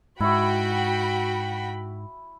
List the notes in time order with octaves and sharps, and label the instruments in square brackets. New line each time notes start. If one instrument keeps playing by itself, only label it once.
[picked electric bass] G#2 [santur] E4 C#6 [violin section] F#4 G5 B5